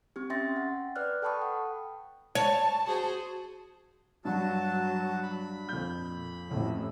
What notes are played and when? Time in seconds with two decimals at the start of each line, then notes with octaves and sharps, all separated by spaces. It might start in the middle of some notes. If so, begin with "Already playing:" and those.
0.16 C4 G4
0.30 C#4 E5 G5 C6 A6 A#6
0.56 F#5
0.96 B4 D5 F6 F#6
1.22 A4 G5 A5 B5 C#6 D#6
1.42 F#5
2.35 C#5 A5
2.86 F#4 G#4 C5
4.25 G2 F#3 F#4 A5
5.23 B5
5.69 F2 A#2 G6
6.51 A1 F2 A2